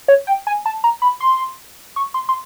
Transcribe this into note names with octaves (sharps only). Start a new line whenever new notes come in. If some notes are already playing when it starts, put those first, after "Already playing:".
C#5
G5
G#5
A5
A#5
B5
C6
C#6
C6
C6